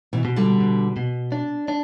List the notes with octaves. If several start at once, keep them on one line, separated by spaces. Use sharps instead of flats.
B2 E3
B2
D3 G3
B2
B2
D4
D4